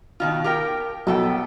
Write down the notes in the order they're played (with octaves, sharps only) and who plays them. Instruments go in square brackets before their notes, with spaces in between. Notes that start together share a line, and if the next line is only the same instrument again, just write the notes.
[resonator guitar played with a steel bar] B2 D#3 F4
G4 A#4 G5
[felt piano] B1 [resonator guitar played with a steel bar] B3 A4 G5